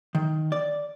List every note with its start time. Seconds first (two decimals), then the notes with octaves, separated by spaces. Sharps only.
0.15 D#3
0.52 D5